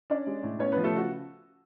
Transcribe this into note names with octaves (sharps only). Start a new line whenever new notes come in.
C#4 D4 D5
G#3
A2
B3 C#4 C#5
F3 B3 B4
A3 A4
C#3 F#4